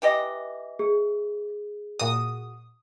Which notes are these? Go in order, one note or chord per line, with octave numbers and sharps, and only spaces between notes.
E3 G4 D#5
G#4
A#2 F#4 D#6